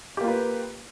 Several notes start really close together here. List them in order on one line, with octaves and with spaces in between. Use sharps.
G4 A#3 F4 B4